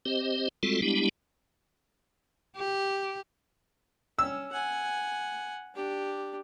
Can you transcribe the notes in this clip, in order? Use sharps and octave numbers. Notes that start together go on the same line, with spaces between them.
C4 G4 C5 D#5
G3 G#3 C4 F4 F#4 A4
G3 G#3 B3 D4 E4 G4
G4
C#4 E6
F#5 G#5
D4 G4